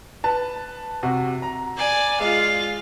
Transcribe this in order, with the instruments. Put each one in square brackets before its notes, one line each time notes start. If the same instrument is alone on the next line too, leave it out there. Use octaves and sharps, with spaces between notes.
[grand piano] B4 A5
C3 F#4
A#5
[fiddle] D5 G#5
[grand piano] G#3 [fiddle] F4 F5